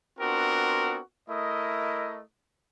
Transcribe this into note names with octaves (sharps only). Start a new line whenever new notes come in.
B3 C4 D4 F4 F#4 A#4
A3 E4 A#4 D#5